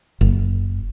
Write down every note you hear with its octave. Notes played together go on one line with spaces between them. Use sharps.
F#1